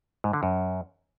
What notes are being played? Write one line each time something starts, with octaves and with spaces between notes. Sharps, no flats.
G#2
D3
F#2